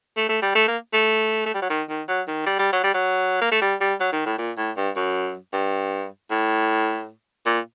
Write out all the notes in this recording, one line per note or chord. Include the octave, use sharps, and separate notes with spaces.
A3
A3
G3
A3
A#3
A3
A3
G3
F#3
D#3
D#3
F#3
D#3
G3
G3
F#3
G3
F#3
A#3
A3
G3
G3
F#3
D#3
A2
A#2
A2
G2
F#2
G2
A2
A#2